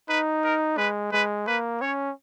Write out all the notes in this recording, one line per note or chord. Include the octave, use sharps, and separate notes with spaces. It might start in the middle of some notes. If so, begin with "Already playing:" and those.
D#4 B4
A#4
G#3 B4
G#3 B4
A#3 B4
C#4 C#5